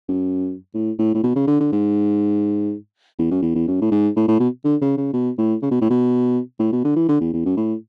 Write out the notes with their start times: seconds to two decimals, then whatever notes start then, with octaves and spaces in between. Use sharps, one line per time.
0.09 F#2
0.74 A2
0.98 A2
1.15 A2
1.23 B2
1.36 C#3
1.47 D3
1.60 D3
1.72 G#2
3.19 E2
3.31 F#2
3.42 E2
3.55 E2
3.67 F#2
3.81 A2
3.91 G#2
4.16 A2
4.28 A2
4.40 B2
4.64 D3
4.81 C#3
4.97 C#3
5.13 B2
5.38 A2
5.62 C#3
5.71 B2
5.81 A2
5.90 B2
6.59 A2
6.72 B2
6.84 D3
6.96 E3
7.09 D3
7.21 E2
7.34 E2
7.45 F#2
7.57 A2